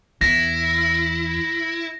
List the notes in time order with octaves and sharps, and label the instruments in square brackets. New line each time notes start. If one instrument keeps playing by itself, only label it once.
[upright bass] E2 [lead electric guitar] E4 [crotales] A#6